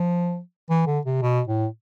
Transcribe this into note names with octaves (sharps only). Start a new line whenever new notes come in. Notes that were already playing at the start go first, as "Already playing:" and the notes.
Already playing: F3
E3
D3
C3
B2
A2